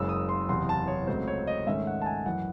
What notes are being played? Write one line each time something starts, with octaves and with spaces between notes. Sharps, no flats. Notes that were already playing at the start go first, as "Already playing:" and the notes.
Already playing: F#1 F#2 C#3 G#3 E6
D#6
C6
F#1 E2 C3 C6
A5
C#5
C#2 C#3 F#3 A3 C4 C5
C#5
D#5
G#2 D#3 A3 C#4 E5
F#5
A5
G#5
F#2 E3 F#5